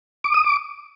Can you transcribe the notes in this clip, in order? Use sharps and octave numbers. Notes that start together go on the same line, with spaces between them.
D6
D#6
D6